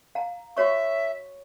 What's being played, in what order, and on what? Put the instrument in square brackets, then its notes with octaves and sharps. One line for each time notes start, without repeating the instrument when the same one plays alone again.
[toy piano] F5 A#5
[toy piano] F#4 C#5 C#6 [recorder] E5